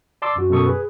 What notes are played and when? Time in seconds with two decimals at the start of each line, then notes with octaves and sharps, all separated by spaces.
0.22 D5 A5 C6 D6 E6
0.36 F#2 F#4
0.50 F#2 B2 A4 C#6 D#6
0.66 G#4 B4